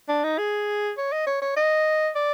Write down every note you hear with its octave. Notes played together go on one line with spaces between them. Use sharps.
D4
D#4
G#4
C#5
D#5
C#5
C#5
D#5
D5